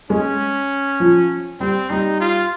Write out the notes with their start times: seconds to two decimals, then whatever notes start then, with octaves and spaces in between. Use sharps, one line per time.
0.10 G#3 C#4
1.00 F3
1.60 G3 C4
1.90 G3 D#4
2.20 F4